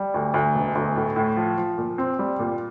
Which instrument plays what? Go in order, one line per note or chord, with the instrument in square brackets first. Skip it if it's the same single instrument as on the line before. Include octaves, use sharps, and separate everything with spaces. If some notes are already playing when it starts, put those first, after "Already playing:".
Already playing: [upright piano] G3
D2
D2
E1
D2
A2
A2
F3
F3
A#2
C4
G3
A#2